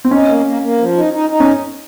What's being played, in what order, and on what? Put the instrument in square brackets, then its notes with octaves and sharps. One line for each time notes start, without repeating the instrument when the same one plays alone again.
[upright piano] C4
[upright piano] C#4 [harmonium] D#4
[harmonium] A#3
A#3
A#3
F3
D#4
D#4
D#4
[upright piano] C#4